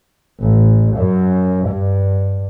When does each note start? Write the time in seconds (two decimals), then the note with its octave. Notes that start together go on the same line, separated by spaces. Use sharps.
0.41 A1
0.98 F#2
1.68 G2